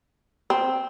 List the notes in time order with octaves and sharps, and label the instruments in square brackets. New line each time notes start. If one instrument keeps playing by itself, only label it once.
[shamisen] C4